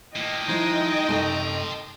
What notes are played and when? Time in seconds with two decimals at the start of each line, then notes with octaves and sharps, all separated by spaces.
0.16 A2 A#3 D#5 G5
0.48 D#3 F3 G#3 D#4 E4
1.09 F#2 C3 A3 A5 C6